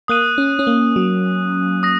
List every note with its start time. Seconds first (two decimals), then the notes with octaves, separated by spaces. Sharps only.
0.08 A#3 D#6 F#6 D#7
0.38 C#4
0.59 C#4
0.67 A#3
0.96 F#3
1.83 D#6 A#6